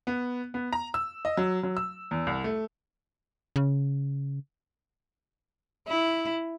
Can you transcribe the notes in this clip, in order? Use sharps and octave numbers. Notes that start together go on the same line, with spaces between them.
B3
B3
A#5
E6
D#5
F#3
F#3
E6
E2
C2
A3
C#3
E4